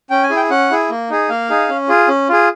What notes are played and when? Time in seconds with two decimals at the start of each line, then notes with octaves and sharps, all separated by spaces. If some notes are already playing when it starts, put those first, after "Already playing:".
0.10 C#4 G5
0.23 G#5
0.30 E4 G#4
0.36 G5
0.50 C#4 F#5
0.70 E4 G#4
0.90 A#3
1.10 D#4 G#4
1.29 A#3 F5
1.50 D#4 G#4
1.69 C#4
1.89 F4 G#4
2.08 C#4
2.29 F4 G#4